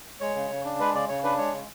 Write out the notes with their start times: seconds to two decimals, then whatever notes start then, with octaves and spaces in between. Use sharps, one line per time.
0.20 G#3 C#5
0.35 C#3
0.50 C#3
0.65 D4
0.80 G#3 B4
0.94 C#3 D5
1.09 C#3 C#5
1.24 D4 B4
1.38 G#3 C#5
1.52 C#3